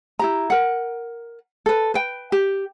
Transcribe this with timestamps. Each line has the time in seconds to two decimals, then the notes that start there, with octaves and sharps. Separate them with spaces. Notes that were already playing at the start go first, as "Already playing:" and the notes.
0.19 E4 G4 A#5
0.50 A#4 F#5
1.66 A4 B4
1.94 B4 G5
2.32 G4